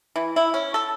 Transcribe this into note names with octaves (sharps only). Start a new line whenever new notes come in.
E3
E4
C#4
A4